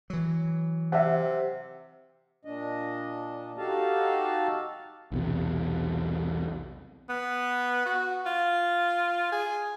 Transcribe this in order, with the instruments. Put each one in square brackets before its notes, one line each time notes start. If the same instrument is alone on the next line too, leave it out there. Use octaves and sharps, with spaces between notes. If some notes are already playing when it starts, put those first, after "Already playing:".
[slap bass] E3 F#3
[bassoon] C3 [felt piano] E5 F#5
[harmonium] A#2 D4 D#5
D#4 F#4 G4 A4 F5 A5
[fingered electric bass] B1 E2 C3
[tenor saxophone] B3
F#4
F4
G#4